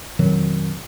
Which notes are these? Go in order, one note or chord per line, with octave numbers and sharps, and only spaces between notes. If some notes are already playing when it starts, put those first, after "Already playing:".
F2 B2 D#3 F#3